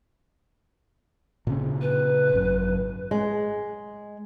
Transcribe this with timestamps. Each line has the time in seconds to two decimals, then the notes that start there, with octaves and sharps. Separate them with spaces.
1.47 A#2 C#3 C#4
1.81 B4
2.33 G#1 F#2
3.11 G#3